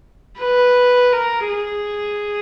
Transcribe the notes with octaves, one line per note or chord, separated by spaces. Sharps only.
B4
A#4
G#4